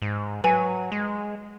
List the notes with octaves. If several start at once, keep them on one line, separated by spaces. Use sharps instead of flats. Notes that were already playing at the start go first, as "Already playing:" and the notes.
G#2
F#3 B4 G#5
G#3